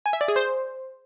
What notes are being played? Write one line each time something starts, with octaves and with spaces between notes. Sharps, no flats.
G#5
E5
D5
G#4
C5